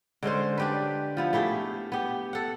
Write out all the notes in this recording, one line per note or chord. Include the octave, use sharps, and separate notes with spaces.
D3 G#3 C#4 C5
D4 G4 B4
F3 B3 E4
A3 E4 G4 G#4
B3 G4
A4 F#5